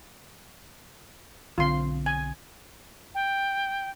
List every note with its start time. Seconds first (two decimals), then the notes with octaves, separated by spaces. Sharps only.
1.58 B1 D3 C4 F4 C6
2.06 G#5
3.14 G5